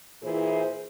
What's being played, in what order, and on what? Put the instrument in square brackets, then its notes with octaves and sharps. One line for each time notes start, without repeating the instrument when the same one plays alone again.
[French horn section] A#2 E3 E4 G#4 C5